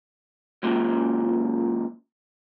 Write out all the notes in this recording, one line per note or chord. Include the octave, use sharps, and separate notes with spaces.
C#2 F#2 A#2